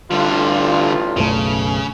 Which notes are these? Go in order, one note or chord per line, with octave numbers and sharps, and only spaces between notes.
A1 G2 D3 G3 F4
F#1 B1 C#3 A3